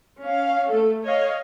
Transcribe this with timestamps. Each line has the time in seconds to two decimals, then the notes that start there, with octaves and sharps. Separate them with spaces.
0.22 C#4 F5
0.69 A3 A4
1.04 C#5 D#5 F5